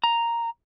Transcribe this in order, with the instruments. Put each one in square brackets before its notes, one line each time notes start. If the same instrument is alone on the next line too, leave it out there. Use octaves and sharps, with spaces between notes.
[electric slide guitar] A#5